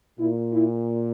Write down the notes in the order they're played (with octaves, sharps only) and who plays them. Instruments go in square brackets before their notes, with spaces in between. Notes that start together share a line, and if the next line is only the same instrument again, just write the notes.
[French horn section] A#2 E4
E4